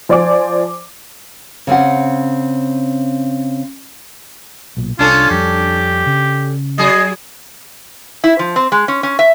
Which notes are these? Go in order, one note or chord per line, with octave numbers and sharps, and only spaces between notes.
F3 C5 D5 G#5 D6
C#3 C4 C#4 F#5
B1 A#2
C2 C#4 D4 F4 A4
F2 G3 G4
C#3
F#3 G#4 D#5
E4
F3
C4
G#3
C#4
C#4
E5